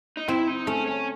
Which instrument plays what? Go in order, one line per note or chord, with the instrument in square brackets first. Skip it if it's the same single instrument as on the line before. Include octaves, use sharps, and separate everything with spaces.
[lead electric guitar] D#4
[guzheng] C4 [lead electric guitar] E4
[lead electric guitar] D#4
[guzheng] A3 [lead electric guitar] C#4
[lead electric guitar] C#4